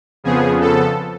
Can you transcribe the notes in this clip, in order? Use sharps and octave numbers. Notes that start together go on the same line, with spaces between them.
F2 C#3 F3 B3 G#4
A4